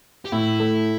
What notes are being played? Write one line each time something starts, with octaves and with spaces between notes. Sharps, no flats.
G4
A2 E4
A3